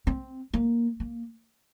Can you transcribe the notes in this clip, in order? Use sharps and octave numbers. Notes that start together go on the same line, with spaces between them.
C4
A#3
A#3